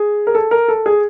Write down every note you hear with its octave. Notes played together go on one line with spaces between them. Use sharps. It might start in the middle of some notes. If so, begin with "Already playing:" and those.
Already playing: G#4
A#4
A4
A#4
A4
G#4